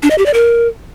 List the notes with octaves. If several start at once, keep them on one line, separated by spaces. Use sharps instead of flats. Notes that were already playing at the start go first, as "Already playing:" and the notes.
D4
D#5
G4
D5
A#4